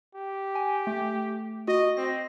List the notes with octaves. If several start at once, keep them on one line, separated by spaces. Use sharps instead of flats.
G4
G#5
A3
F#4 D#5
C4 A#6